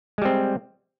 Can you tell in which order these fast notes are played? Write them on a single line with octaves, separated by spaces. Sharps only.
G#3 G3 C4